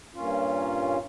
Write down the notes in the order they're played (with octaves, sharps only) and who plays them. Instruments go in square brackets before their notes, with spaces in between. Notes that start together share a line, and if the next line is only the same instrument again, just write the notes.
[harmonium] G2 A#2 C#4 F4